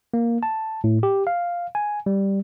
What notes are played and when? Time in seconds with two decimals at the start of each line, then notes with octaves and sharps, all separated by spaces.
0.14 A#3
0.43 A5
0.84 A2
1.03 G4
1.27 F5
1.75 G#5
2.06 G3